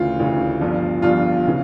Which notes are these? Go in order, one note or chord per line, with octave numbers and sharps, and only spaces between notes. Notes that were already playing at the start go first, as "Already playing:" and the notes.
Already playing: D2 C#3 E3 F4
D2 C#3 E3
G1 G2 F3
G1 G2 F3 F4
C#3 E3